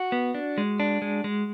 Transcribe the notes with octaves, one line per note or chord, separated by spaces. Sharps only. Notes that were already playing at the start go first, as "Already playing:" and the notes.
Already playing: F#4
B3
D4
G#3
D4
G#3
G#3